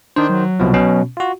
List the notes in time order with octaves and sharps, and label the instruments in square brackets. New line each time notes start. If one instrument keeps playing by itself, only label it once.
[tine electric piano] D#3 C5 [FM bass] D4
[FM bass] F#3
[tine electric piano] C2 B2 F3
B2 C#4
F4 F#4